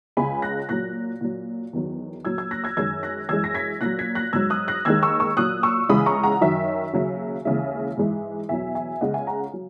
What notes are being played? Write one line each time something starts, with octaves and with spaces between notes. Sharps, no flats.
C#2 C#3 G#3 G#5 B5
F#6 A#6
A#2 F#3 F#6 A#6
A#2 F#3
E2 D#3 F#3
A#2 F#3 E6 G#6
E6 G#6
F#6 A#6
E6 G#6
F#2 D#3 G#3 E6 G#6
F#6 A#6
F#2 E3 G#3 E6 G#6
A#6
G#6 B6
A#2 F#3 F#6 A#6
G#6 B6
F#6 A#6
G#2 F#3 E6 G#6
D#6 F#6
F#6 A#6
D#2 D#3 G#3 E6 G#6
C#6 E6
C#6 E6
A#2 F#3 D#6 F#6
C#6 E6
C#2 C#3 E3 G#3 B5 D#6
A#5 C#6
F#5 A#5
F#2 D#3 F#3 E5
D#2 C#3 F#3
D#2 C#3 E3 G#3 E5
G#2 E3 G#3
E2 B2 F#3 E5 G#5
E5 G#5
C#2 C#3 G#3 D#5 F#5
E5 G#5
F#5 A#5
F#3